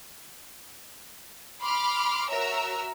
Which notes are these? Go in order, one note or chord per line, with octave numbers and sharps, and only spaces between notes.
B5 C6 D6 F6
F#4 A#4 C#5 E5 A#5 E6